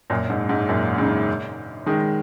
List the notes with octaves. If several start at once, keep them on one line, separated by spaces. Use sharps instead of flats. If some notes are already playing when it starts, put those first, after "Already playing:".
F#2 A#2
G#2
G#2
F#2 A#2
G#2 C#3
D#3 G#3